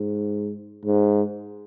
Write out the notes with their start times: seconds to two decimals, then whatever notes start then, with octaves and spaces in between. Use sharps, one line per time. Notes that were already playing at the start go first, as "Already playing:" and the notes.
Already playing: G#2
0.85 G#2